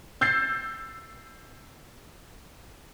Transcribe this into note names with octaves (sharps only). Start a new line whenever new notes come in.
E6 G6 A6 C7